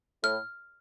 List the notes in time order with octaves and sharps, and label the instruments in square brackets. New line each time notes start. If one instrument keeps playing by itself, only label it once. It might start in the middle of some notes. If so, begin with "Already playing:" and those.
[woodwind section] A2 [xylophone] F6